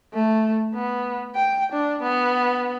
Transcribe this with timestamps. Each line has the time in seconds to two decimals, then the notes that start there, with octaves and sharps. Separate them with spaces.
0.14 A3
0.75 B3
1.35 G5
1.73 D4
2.03 B3